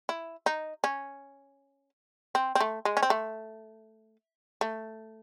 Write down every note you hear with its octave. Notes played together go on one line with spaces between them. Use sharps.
E4
D#4
C#4
C4
C4
A3
G#3
C#4
C4
A3
A3